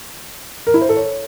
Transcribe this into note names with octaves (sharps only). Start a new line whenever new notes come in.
A#4
E4
C5
A4
C#5